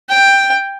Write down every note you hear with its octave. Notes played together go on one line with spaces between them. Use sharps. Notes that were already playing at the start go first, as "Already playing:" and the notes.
G5